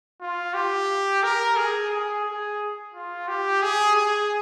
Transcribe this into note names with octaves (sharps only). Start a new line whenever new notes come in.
F4
G4
A#4
G#4
G#4
G#4
F4
G4
G#4
G#4